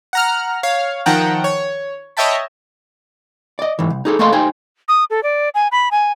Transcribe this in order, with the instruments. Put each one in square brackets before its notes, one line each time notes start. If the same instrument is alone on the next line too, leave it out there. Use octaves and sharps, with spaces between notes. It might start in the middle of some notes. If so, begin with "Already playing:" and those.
[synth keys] F#5 A#5 F6
C#5 F5
D#3 F3 F#5 G5 A5 A#5
C#5
C#5 D#5 E5 G5 A5 B5
[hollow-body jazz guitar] D5 D#5
G#2 E3
C2
D#4 G#4 A4
A3 A#3 A4 D#5 F5 C6
D#4 G4 C5 G5 G#5
[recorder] D#6
A4
D5
G#5
B5
G#5